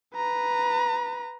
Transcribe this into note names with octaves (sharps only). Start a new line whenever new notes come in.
B4 A#5